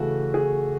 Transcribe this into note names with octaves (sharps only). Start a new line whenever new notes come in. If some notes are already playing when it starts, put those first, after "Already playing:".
Already playing: C#3 E3 A3 F#4
G#4